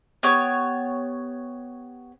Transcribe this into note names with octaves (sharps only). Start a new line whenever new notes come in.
B3 G4 C#5